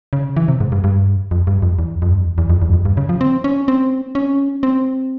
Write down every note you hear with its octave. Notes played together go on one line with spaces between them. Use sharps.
C#3
E3
C3
G#2
G2
G2
F2
G2
F2
E2
F2
G2
F2
E2
E2
F2
E2
G2
F2
G2
C#3
F3
C4
C#4
C4
C#4
C4